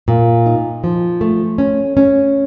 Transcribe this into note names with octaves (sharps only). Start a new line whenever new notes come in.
A#2
D#4
F3
A3
C#4
C#4